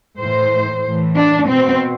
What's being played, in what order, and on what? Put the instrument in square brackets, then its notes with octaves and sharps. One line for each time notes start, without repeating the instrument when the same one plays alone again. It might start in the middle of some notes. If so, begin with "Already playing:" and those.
[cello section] A2 E3 C5
A2 E3
D4
B2 C4